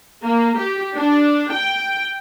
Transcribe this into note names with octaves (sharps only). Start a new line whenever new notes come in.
A#3
G4
D4
G5